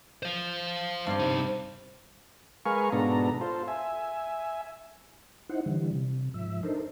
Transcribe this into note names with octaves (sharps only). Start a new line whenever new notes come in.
C5 F5
G2 C4 D5
C2 D#4
G#3 A#4 B4 F5 G#5 C#6
G#2 B2 B3 D4 A4 A#5
F4 A4 C5
E5 G#5
D#4 E4 C5 F#5
D3 E3 G3
C3
G#2 F3 E5
D4 D#4 A4 A#4 C5